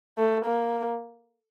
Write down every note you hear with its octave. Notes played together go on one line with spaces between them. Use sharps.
A3
A#3